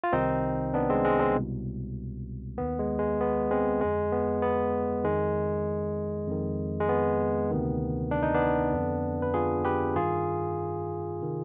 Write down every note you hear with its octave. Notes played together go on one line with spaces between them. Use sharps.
F4
C2 C3 D#3 C4 D#4
B3 D4
G#3 C4
G#3 C4
G#3 C4
C2 B2
D#2 D#3 B3
G#3
G#3
B3
G#3 C4
F2 D3 G#3
B3
B3
F2 D#3 G#3
F2 D#3
G#3
B3
D2 C3 D#3
D4
D#4
B3 D4
F2 D3
B4
F4 G#4
G4 B4
G2 D#3 F4 G#4
C3 D#3